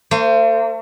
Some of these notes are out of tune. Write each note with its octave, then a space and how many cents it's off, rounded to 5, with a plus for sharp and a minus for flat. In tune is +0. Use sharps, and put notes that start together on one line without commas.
A3 +45 C5 +0